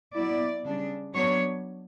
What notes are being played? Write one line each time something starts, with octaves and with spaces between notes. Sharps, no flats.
F#3 B3 E4 D5
C#3 G3 D4
F#3 B3 D4 C#5